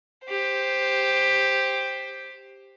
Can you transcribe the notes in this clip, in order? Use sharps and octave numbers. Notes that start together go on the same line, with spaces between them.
G4 C5